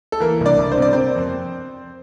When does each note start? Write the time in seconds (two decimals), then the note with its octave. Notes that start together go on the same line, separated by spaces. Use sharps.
0.12 A4
0.20 E3 A#3 A#4
0.40 C2
0.46 D4 D5
0.58 C2
0.72 C5
0.77 C3 D5
0.93 A#3 C4 C5
1.16 F2